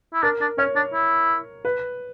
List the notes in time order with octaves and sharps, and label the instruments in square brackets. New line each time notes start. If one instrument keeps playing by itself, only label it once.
[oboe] E4
[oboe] D4 [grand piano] A#4
[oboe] D4
[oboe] C#4 [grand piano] C#5
[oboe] D4
E4
[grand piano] B4